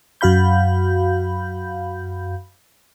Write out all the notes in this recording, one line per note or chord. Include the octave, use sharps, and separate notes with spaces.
F#2 F#4 F5 B5 G6